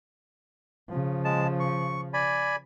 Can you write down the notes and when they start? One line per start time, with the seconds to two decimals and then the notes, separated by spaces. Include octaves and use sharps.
0.90 C#3 F3
1.25 G#3 A5
1.60 C#6
2.14 D5 G#5 B5